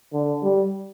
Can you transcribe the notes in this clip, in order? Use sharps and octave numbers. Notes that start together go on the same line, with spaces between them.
D3
G3